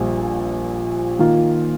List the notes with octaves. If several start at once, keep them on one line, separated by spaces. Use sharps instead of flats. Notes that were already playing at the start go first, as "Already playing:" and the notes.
Already playing: A#1 A#2 G3
D#3 A#3 F4